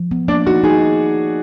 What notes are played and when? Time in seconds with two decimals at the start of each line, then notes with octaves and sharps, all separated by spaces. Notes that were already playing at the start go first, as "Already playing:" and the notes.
Already playing: F3
0.11 B3
0.28 A#3 D4
0.46 D#4 F#4
0.64 D#4 G#4